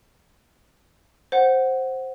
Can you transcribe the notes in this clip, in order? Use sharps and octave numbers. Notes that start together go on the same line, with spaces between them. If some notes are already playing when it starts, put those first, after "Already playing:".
C5 F#5